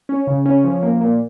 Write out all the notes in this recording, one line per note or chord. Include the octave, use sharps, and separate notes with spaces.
C#4
C#3
C#4
F3
A#3
A#2